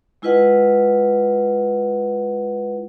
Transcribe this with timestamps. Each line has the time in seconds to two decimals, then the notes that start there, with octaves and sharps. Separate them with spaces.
0.22 G#3 E4 F4 B4 D#5 F#5